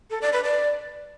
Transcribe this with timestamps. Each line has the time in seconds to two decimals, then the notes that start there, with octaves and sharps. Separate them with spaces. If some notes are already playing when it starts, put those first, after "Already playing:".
0.10 A4
0.22 D5
0.33 B4
0.44 D5